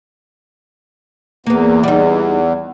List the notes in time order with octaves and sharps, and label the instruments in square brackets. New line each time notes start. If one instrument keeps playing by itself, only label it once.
[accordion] E2 [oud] A#3 B3
[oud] G3 D#4